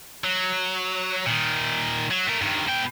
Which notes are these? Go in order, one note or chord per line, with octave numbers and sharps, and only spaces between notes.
F#3
A#2 D#3
F#3
A3 A#4
G2 D#3
B2 G5